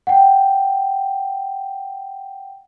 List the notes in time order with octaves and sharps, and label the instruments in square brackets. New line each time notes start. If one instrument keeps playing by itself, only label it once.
[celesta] F#5 G5